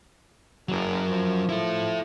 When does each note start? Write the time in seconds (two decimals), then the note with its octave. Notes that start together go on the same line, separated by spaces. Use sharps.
0.69 F#1 F#3 A#4
1.09 F3
1.49 E4 A4